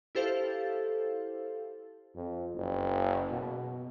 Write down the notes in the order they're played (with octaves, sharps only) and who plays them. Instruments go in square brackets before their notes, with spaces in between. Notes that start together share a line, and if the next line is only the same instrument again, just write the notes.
[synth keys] E4 G4 A4 C5 F5
[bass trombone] F2
F#1
B2